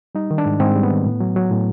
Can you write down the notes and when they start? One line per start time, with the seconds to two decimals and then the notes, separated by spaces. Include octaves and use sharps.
0.15 G3 D#4
0.31 D#3
0.38 D4
0.46 G#2
0.60 G#2 C4
0.76 G3
0.83 B3
0.91 D#3
1.06 A2
1.20 F#3
1.36 F#3
1.51 A2